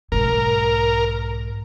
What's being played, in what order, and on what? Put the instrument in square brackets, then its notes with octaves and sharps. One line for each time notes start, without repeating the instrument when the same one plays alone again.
[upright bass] B1 G#2 [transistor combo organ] A#4